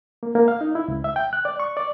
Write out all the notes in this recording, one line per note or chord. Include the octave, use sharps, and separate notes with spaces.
A#3
A#3
F5
D#4
E4
C#2
E5
G5
F#6
D5
C#6
D5